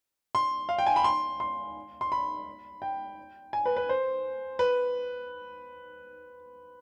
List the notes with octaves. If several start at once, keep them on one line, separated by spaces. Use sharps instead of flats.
C6
F5
G5
G#5
B5
C6
C6
C6
B5
G5
G#5
B4
B4
C5
B4